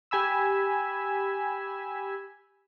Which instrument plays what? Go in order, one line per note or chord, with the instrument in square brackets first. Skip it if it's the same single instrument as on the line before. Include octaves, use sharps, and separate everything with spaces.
[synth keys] G4 G#5 B5 E6